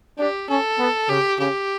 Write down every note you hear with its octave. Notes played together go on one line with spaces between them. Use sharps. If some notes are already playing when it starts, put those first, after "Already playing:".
D4 G4
C#4 A4
B3
C#3 G4
C#3 G4